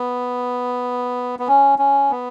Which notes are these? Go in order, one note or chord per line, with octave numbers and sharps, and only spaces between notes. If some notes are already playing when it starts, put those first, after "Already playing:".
Already playing: B3
B3
C#4
C#4
B3